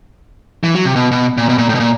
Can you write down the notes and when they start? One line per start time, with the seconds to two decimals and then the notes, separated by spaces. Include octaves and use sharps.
0.64 E3
0.75 F#3
0.85 C3
0.96 B2
1.11 B2
1.38 A#2
1.49 B2
1.58 A#2
1.69 A2
1.75 B2
1.80 A#2